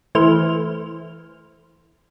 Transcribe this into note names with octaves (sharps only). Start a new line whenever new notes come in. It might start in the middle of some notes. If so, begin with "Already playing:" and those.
E3 A3 C5 F6